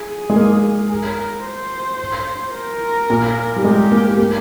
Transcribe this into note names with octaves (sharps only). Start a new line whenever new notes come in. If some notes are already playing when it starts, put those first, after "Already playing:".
Already playing: G#4
G#3
A#3
A#4
C5
A#4
A#2
G3
G#3 G4
A#3
A#3